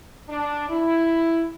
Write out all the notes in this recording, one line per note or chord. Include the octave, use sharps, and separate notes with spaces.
D4
E4